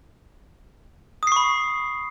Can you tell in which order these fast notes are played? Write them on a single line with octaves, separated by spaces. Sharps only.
D#6 C7 C#6 B5